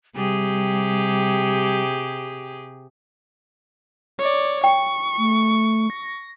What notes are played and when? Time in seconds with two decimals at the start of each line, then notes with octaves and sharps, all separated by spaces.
0.16 C3 G3 G4 G#4
4.19 C#5 D5
4.64 G5 C#6
5.17 A3
5.90 A#6